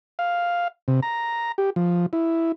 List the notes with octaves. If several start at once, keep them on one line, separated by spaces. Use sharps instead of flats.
F5
C3
A#5
G4
F3
E4